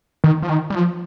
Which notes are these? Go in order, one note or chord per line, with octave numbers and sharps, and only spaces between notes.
D#3
F3
D#3
G3
F3